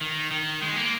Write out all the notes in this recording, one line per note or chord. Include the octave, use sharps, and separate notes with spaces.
D#3
D#3
G#3
A#3